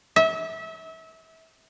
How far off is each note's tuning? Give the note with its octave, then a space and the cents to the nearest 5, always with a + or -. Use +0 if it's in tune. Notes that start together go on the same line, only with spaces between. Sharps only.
E5 -30